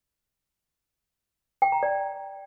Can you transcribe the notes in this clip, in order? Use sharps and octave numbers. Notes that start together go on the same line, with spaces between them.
G5
A#5
D5